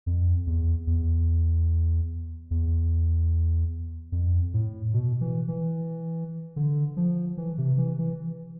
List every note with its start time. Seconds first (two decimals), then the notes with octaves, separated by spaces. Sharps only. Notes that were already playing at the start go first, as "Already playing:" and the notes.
0.06 F2
0.47 E2
0.87 E2
2.51 E2
4.12 F2
4.54 A2
4.94 B2
5.21 E3
5.48 E3
6.56 D3
6.97 F3
7.37 E3
7.58 C3
7.78 E3
7.99 E3